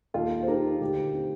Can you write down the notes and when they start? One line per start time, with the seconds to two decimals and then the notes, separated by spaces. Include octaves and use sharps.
0.14 D#2 F4 A4
0.43 C5
0.48 D#4 G4 A#4
0.81 D2 G4
1.15 C4